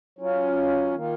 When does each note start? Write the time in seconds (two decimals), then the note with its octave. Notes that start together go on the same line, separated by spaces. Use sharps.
0.19 F#3 C#4 F4
0.94 D#3 A#3 F4